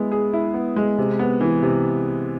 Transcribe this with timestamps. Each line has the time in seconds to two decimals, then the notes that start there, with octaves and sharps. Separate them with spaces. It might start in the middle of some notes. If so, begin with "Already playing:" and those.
Already playing: G#3 B3 E4
0.12 G#4
0.33 E4
0.54 B3
0.76 G#3
0.98 C3
1.19 B3
1.41 E3
1.63 C3